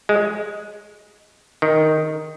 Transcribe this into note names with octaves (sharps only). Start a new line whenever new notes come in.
G#3
D#3